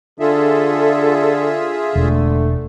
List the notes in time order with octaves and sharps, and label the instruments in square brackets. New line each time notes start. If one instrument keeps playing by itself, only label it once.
[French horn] D3 [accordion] F4 G#4 E5 [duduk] A4
[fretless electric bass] E1 [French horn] D3 [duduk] A3